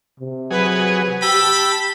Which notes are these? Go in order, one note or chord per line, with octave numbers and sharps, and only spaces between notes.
C3
F#3 G#4 B4
G4 G5 A5 B5 E6